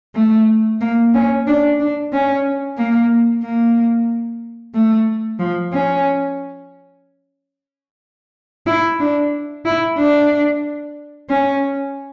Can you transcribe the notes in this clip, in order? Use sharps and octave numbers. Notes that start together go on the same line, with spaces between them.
A3
A#3
C#4
D4
D4
C#4
A#3
A#3
A3
F3
C#4
E4
D4
E4
D4
C#4